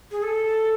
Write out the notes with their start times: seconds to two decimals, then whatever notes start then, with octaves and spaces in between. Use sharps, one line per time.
0.11 G#4
0.23 A4